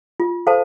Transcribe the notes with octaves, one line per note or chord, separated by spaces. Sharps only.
F4
A4 C5 F5 A5